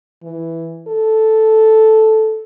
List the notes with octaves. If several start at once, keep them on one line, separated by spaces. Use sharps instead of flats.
E3
A4